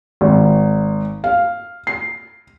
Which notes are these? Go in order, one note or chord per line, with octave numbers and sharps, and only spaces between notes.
G#1
F5
C7